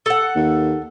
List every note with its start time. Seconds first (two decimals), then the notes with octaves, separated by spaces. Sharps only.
0.06 A4 F#5
0.35 D#2